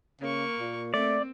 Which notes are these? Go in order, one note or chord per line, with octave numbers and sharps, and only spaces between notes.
C#3 A#3 C#6
A#2
A3 C4 D5